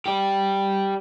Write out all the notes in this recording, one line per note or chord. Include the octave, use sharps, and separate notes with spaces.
G4 D5